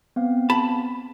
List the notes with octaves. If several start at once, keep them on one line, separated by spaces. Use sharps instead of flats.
B3 C4 F5
A5 B5